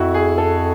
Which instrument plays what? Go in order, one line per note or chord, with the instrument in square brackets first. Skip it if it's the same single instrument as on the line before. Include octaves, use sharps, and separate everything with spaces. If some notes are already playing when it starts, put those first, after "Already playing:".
Already playing: [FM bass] F2 [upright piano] E4 F#4
[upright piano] G#4
A4